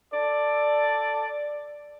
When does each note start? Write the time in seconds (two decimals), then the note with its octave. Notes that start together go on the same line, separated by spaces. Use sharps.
0.13 A4 D5